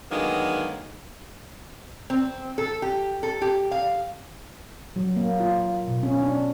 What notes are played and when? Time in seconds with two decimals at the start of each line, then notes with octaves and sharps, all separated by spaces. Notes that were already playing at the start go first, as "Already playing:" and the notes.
0.11 D3 D#3 F#3 G#3 A#3 B3
2.10 C4
2.58 A4
2.82 G4
3.23 A4
3.42 G4
3.71 F5
4.96 F#3
5.16 A#3
5.40 F4
5.88 B2
6.03 C#4
6.23 D4